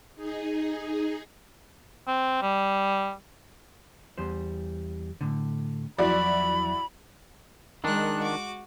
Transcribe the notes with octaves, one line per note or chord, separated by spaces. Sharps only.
D#4 G#4
C4
G3
E2 G3 C5
A2 D3
E2 F3 F#3 E4 F#4 D5 B5
D#3 G#3 D4 A#4 F#6
F#4 D6